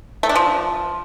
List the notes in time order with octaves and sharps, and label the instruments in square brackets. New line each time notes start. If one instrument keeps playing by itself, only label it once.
[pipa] A3
D4
F3